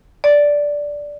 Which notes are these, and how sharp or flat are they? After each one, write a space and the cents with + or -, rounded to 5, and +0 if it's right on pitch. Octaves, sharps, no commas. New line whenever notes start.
D5 -5